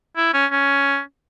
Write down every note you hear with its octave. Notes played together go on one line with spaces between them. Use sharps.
E4
C#4
C#4